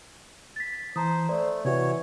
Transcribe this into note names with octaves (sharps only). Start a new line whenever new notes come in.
A6 B6
E3 C5 A5 A#5 D#6
A3 C5 D5
C3 E3 F#4 C#5